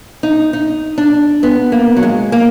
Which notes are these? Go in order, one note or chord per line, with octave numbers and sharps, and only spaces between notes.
D#4
D#4
D4
B3
A#3
F#3
G#3
A#3